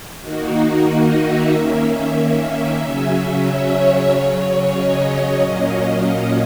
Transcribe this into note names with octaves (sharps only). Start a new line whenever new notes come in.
D#3 A#3 D#4 F#4
D#5
E5
D#3 A#3 C#4 E5
E5
C#3 F#3 C#4
C#5
C#3 F#3 C#4
D#5
A#2 F#3 A#3 C#4